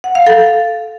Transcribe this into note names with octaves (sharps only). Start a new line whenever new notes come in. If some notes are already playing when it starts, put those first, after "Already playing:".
F#5
F5
A4